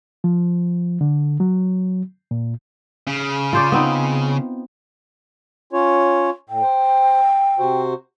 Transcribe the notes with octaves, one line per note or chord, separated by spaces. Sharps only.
F3
D3
F#3
A#2
C#3
F4 C5 D5
B3 C4 D#4
C#4 F4 C#5
A2 G5
C5
C3 F#4 C5